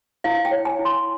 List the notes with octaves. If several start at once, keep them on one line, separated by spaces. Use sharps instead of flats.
E4 F5
G5
C#5
G#5
E4
C6